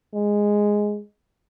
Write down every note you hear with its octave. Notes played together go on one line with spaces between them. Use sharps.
G#3